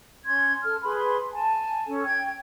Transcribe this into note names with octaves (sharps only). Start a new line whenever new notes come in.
C#4 C6 G#6
A4 F6
G#4 B4 B5 C6
G#5 A5
C#4 A4
G5 G#6